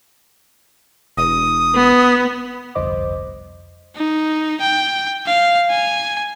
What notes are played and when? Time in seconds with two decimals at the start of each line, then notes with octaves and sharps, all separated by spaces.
1.17 E1 D#6
1.75 B3
2.75 G1 C2 F2 C5 D#5 D6
3.96 D#4
4.61 G5
5.27 F5
5.70 G#5